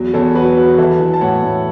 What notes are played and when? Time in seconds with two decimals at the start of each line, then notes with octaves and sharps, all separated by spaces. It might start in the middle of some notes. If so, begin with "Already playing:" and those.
Already playing: E2 F#3
0.14 E2 A4 C#5
0.35 F#3 F#4 B4
0.57 F#3 F#4 B4
0.78 E3 E4 A4
1.00 E3
1.13 A5
1.21 A2 C#5 F#5
1.43 A2